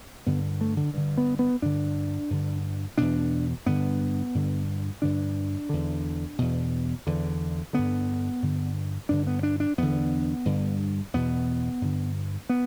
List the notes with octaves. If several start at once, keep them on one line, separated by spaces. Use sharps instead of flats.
G2 D3 B3
A3
D3
G2 D3
B3
B3
G2 D3 D4
G2 D3
E2 B2 D4
G2 D3 B3
G2 D3
G2 D3 D4
E2 D3
E2 B2
E2 D3
G2 D3 B3
G2 D3
G2 D3 D4
B3
D4
D4
E2 D3 B3
G2 D3
E2 B2 B3
G2 D3
B3